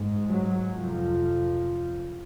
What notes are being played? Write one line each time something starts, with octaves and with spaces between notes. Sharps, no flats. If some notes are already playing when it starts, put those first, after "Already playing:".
Already playing: G#2
F#3
F2 C3 F3